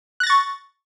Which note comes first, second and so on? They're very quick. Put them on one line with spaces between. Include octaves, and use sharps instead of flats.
F#6 A#6 A6 C#6